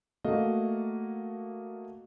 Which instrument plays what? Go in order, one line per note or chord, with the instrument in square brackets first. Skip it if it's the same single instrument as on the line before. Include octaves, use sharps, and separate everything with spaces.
[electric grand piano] A3 A#3 F#4 A4 D#5 F5